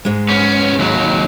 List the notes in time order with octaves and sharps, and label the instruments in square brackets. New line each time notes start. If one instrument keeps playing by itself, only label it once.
[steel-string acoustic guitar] G#2 G#3
[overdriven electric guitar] B3 C#4
D#2 F#3